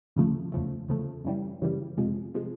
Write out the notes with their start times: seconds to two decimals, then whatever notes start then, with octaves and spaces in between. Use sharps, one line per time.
0.16 D#2 C#3 F3 A3
0.52 E2 C#3 F3 A3
0.89 E2 C#3 F3 A3
1.25 F#2 C#3 E3 G3
1.62 F#2 C#3 E3 G3
1.97 F2 C3 F3 G#3
2.35 C3 F3 G#3